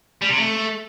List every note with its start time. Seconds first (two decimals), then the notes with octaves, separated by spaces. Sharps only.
0.22 G3
0.30 C3
0.38 A3